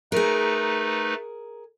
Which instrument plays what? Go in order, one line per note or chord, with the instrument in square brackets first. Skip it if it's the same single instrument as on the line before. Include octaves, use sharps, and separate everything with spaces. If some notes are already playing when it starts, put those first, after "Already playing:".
[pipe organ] A3 D#4 B4 [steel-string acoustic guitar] G#4 A#4